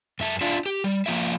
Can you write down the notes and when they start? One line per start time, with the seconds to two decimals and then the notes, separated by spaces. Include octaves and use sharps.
0.20 F#2 E5 A5
0.41 D4 F4 E5 F5
0.66 G4
0.84 G3
1.06 F3 A#3 F4 E5